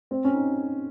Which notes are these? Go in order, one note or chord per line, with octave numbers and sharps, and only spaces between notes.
C4
C#4
D#4